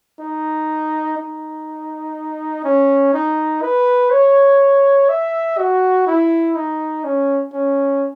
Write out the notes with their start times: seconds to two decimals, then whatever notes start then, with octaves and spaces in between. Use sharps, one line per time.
0.19 D#4
1.17 D#4
2.64 C#4
3.13 D#4
3.62 B4
4.11 C#5
5.09 E5
5.58 F#4
6.06 E4
6.55 D#4
7.04 C#4
7.53 C#4